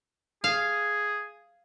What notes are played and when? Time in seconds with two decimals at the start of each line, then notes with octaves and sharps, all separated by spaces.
0.44 G#4 F5